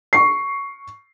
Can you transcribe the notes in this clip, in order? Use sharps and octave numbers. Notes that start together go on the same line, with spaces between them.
C#6 C7